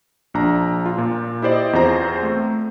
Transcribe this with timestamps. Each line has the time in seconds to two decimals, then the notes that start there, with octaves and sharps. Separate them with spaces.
0.34 A#1 D4 A#5
0.86 F4
0.98 A#2
1.42 E4 G4 C5 D5 D#5
1.73 E2 C4 F4 C5 A#5
2.23 A3